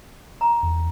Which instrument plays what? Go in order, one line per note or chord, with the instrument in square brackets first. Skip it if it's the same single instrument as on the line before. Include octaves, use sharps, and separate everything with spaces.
[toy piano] A#5
[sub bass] E2